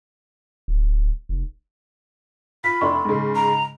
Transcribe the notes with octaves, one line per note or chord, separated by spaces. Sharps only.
D1
F1
F4 B5 B6
F1 D4 E4 C6 C#6
G#2 C#3
A#5